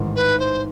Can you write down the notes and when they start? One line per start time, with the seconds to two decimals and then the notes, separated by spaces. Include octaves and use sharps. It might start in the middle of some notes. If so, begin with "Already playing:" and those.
Already playing: A1 G#2 D#3
0.16 B4
0.39 C5